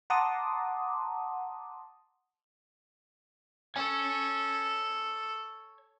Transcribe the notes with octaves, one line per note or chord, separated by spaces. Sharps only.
F#5 A5 A#5 C6 D6 D#6
A4 C#5 G#5